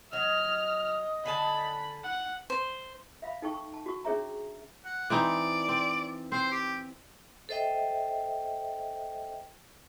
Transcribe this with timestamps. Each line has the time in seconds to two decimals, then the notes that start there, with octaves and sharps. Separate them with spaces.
0.13 F#3 D#5 F6
1.26 D3 G#5 A5 B5
2.04 F#5
2.50 C5
3.22 E5 F5 B5
3.42 D#4 A4 G5 A5 C#6
3.54 C#6
3.74 A5
3.86 F#4 C#6
4.05 C#4 D4 G#4 C#5 E5 A#5
4.85 F#5
5.10 E3 C4 D#4 D5
5.68 C4
6.32 C4 C5
6.51 G4
7.49 A4 C5 D#5 E5 G5